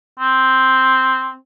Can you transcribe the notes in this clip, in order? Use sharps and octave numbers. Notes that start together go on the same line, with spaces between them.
C4